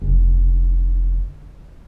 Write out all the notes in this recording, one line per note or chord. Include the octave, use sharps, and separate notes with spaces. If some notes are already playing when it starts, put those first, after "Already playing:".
F1 D3